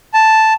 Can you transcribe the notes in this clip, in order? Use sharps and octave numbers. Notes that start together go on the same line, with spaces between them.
A5